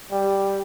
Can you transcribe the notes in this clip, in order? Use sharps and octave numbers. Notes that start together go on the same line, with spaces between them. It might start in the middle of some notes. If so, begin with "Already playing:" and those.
G3